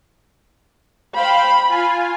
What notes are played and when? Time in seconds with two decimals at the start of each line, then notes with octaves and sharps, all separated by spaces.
1.15 C5 F5 G5 B5
1.69 F4 G#5